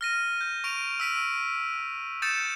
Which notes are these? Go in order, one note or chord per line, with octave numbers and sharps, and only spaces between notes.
F6 A#6 D#7
G6
C#6 D7 D#7 F7
E6 B6 D7 D#7
D#6 G6 A6 C#7 E7